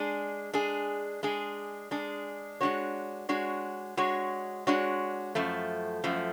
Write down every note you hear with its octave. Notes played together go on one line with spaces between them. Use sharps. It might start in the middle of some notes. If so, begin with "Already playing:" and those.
Already playing: G#3 D4 G#4
G#3 D4 G#4
G#3 D4 G#4
G#3 D4 G#4
G#3 D4 F#4 C#5
G#3 D4 F#4 C#5
G#3 D4 F#4 C#5
G#3 D4 F#4 C#5
F#2 F3 A3
F#2 F3 A3